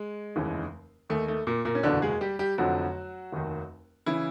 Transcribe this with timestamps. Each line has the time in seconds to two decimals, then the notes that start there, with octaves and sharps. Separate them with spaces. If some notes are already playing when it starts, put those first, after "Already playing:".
Already playing: G#3
0.36 F1 D#2 C#3 E3
1.09 D#2 D#3 A3
1.28 A3
1.47 A#2 A#3
1.65 A#2 A#3
1.75 C#4
1.83 F#1 E2 B2 D3 D4
2.02 G#3 G#4
2.21 G3 G4
2.39 G3 G4
2.58 F1 F2 D3 F3 F#3 F#4
3.33 F1 D#2 D#3
4.06 C#3 E3 E4